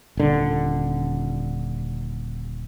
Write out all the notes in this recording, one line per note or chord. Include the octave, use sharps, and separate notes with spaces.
D#1 D3